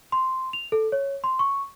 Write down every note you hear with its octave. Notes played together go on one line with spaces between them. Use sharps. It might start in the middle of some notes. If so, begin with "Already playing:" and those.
C6
F7
A4
C#5
C6
C#6